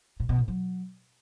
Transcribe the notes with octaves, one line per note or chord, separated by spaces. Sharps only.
A#2
B2
A2
F#3